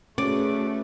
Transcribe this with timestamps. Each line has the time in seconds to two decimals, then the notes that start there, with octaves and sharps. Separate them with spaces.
0.18 A3 C#4 F#4 G#4 B4 D5